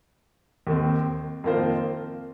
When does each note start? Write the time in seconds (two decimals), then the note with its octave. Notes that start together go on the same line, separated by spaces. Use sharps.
0.67 D#2 D#3 C4
1.44 F2 D#3 A#3 F4 C5